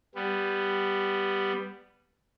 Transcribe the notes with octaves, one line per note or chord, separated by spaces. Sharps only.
G3 B3